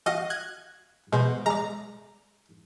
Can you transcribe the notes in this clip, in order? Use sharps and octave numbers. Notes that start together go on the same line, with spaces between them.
F#4 D#5 F5
F#6 G#6
B2 G#3 C5
G#3 D5 A#5